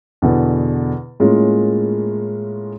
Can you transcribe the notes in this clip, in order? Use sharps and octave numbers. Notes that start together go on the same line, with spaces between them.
E2 B2 D3
A2 G#3 A#3 C#4 F4